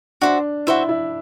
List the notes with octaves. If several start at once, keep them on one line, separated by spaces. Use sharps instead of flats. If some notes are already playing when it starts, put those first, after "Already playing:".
D4 F#4 C5 E5
E4 F#4 C5 E5
E4